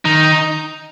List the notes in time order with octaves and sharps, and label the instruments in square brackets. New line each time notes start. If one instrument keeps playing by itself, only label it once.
[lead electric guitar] D#3 [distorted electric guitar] D#4